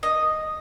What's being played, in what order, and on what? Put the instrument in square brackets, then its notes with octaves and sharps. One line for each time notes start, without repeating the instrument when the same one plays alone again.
[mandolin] D#5